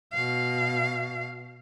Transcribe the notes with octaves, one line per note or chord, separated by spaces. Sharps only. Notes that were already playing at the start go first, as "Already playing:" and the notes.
B2 F5